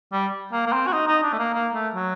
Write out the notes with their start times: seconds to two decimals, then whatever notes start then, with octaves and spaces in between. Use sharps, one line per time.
0.12 G3
0.52 A#3
0.66 A#3
0.73 C4
0.86 F#4
0.93 D#4
1.08 D#4
1.23 D4
1.33 A3
1.39 A#3
1.54 A#3
1.74 A3
1.94 F#3